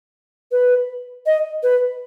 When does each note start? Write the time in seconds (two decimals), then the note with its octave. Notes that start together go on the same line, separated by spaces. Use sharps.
0.52 B4
1.26 D#5
1.63 B4